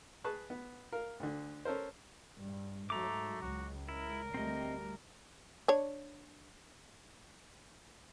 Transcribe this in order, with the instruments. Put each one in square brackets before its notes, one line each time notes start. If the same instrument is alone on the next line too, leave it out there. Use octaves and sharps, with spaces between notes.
[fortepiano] G#4 B4 A5 C#6 F#6
B3
A#4 F5
D2 D3
C#4 A4 A#4 C5
[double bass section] G2
[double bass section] G#2 F#3 [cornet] A3 [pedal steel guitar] A#5 D6
[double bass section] C#2 [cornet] F#4
[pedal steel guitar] E4 [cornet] A#4
[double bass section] D2 G3 A3 [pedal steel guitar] C4 D#5
[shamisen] D4 C#5